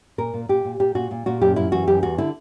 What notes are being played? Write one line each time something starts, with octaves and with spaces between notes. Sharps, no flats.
A#2 A#4
A#2
A#2 G4
A#2
A#2 G4
A#2 F#4
A#2
A#2 F#4
F#2 G4
F#2 E4
E3 F#4
F#2 G4
E2 F#4
D3 E4